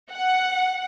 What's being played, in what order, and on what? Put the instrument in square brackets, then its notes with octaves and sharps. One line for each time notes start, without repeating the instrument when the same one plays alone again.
[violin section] F#5